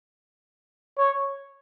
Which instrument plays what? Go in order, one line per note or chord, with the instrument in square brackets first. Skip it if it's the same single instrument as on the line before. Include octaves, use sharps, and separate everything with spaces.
[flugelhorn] C#5